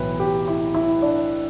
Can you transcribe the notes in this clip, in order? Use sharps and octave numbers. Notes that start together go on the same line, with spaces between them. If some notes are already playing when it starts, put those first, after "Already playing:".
Already playing: B1 A2 E3 B4
G4
E4
E4
D4